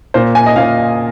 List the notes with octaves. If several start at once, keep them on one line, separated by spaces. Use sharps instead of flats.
A#2 A#3 C5
G#5
D#5
A#2 A#3 F5